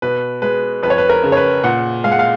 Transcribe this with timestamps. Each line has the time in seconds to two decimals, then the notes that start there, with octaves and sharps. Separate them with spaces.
0.02 B2 B4
0.42 G#3 B4
0.83 F2 B4
0.90 C#5
0.98 B4
1.09 A#4
1.23 C#3
1.32 C#5
1.37 B4
1.64 A#2 F#5
2.04 G#3 F5
2.12 F#5
2.19 F5